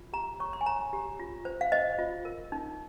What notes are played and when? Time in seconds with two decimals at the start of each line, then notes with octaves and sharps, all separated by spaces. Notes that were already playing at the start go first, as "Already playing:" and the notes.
Already playing: F4
0.13 G4 A#5
0.40 C#5 C#6
0.53 C6
0.61 G#5
0.66 C#5 A#5
0.93 G4
1.19 F4
1.45 C5
1.61 F5
1.72 C5 D#5
1.99 F4
2.25 A#4
2.52 D#4